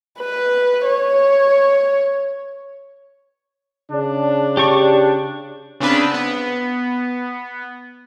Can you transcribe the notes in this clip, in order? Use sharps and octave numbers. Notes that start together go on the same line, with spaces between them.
B4
C#5
C#3 D4
G4 D5 C#6
C#3 B3 C4 D4 B4
B3